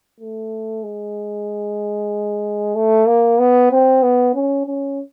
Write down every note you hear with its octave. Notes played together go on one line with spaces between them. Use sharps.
A3
G#3
A3
A#3
B3
C4
B3
C#4
C#4